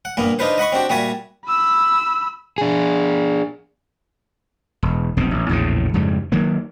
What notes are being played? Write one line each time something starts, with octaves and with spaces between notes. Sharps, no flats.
F#5
G2 A#2 A#3 B3
D4 D#4 F4 B4 C5
D#5 F#5 B5 C#6
C4 D4 F#4 G4
A#2 G3 F#4 E5 G#5 A5
B5 E6
D4 G#4
E1
F1 B1 B2 C4
A1
A#1 E2 A2 C#3
F2 G#2 C#3 G3
D#3 F#3 A#3